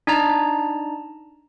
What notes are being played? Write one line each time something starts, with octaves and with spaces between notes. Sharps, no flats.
D4 D#4 A5 A#5